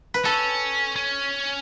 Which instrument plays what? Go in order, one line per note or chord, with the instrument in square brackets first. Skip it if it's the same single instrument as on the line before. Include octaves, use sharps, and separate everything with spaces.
[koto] B4
[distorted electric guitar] C#4 [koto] A4
[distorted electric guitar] C#4